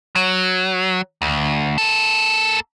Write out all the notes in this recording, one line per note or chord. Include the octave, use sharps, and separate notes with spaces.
F#3
D2
A#3 A4